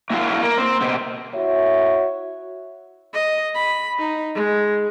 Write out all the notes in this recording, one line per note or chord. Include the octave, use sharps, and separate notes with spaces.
A#3 E4 F#4 F5
A#3
C4
B2 C4
E4 F#4 C#5 E5
D#5
B5
D#4
G#3